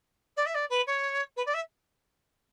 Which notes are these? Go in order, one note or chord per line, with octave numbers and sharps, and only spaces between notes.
D5
E5
D5
B4
C#5
B4
D5
E5